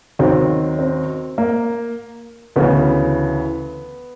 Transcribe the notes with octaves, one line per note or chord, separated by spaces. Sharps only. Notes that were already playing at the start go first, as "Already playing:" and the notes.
D#2 D#3 F#3 C4
C4
A#3
D2 C#3 E3 B3